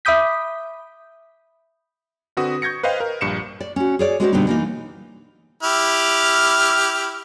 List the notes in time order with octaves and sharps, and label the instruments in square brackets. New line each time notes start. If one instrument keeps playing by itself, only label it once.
[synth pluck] E5 B5 D6 D#6 G6 B6
[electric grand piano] D3 C4 F#4 B4 D#6
C#6 G6 G#6 A#6 C#7
B4 C5 D#5 F5 G5
A#4
A#1 G2 C#7 E7
[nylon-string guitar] D5
C#4 F#4
G#4 C#5 D5
G#3 C#4 F#4 A4 C5 D5
B2 D3 G3 B3 D4 D#4
E3 A#3 D#4
[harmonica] E4 G4 F6